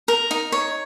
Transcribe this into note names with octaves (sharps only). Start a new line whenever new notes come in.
A#4
D#4
C#5